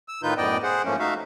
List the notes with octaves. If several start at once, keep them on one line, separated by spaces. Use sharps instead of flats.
E6
A2 D#3 D#4 F4 B4 G6
F#2 A2 B3 D5 D#5 G5
G#4 C5 F#5
G#2 F3 A3 A#3 C#4
A3 D#4 F#4 E5 F5